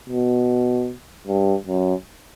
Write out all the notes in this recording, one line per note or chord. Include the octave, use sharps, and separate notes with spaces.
B2
G2
F#2